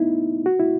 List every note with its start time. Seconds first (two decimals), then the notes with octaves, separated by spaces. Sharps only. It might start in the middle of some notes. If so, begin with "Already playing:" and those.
Already playing: B3 D#4 E4
0.46 F#4
0.60 E4